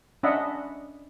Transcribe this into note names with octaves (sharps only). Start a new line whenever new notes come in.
C#4 D4 D#5 E5 F#5 B5